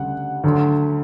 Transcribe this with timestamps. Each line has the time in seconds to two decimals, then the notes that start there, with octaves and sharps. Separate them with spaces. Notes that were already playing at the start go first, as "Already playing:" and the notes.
Already playing: D2 C#3 G3 F#5
0.44 D2 D3 F#3